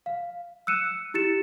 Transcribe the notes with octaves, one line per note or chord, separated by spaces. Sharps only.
F5
E6 F#6 C#7 D#7 E7
E4 G4 A6 C#7 E7